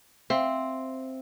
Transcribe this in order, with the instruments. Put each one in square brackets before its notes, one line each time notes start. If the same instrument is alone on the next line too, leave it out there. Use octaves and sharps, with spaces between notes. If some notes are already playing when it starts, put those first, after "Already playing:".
[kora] C4 [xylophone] E5 F5 C6